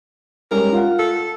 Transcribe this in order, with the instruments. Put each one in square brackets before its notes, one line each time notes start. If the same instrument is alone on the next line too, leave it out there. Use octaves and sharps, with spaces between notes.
[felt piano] G3 G#3 C#4 [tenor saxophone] A#4
[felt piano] F4 F5 F#5
[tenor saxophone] A4